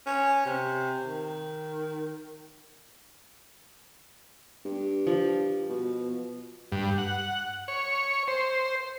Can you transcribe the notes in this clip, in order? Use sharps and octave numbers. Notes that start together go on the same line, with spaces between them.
C#4
C3
D#3
G2
F3
B2
G2
F#5
C#5
C5